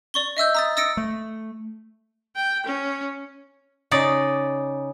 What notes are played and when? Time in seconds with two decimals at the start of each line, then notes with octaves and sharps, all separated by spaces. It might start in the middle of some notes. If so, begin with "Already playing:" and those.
0.14 D5 C#6 G7
0.37 D#5 E5 E6 G6
0.55 A#5 D#6 A6
0.77 D#6 E6 A6 A#6 C#7 D7
0.97 A3
2.36 G5
2.66 C#4
3.91 C#3 D#4 D5